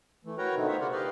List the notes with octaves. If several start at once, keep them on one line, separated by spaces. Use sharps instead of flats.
E3 A3
F#4 A#4 B4 C#5 G5 A#5
B2 D3 A3 C4 D#4
B3 D#4 F4 C5 C#5 E5
C#3 F4 A#4 D5 F#5
G4 B4 D5 D#5 F5 G5